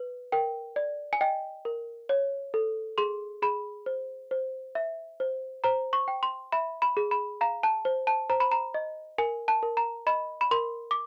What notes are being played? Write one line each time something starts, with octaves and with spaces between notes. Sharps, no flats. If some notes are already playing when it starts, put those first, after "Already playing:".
Already playing: B4
A#4 G5
D5
G#5
D#5 G5
A#4
C#5
A4
G#4 C6
G#4 B5
C5
C5
E5
C5
C5 A#5
C#6
G5
C6
E5 B5
B5
G#4
B5
F5 A#5
A5
C5
A5
C5 A#5
B5
A#5
D#5
A#4 G#5
A5
A#4
A#5
D#5 B5
B5
A#4 C6
D6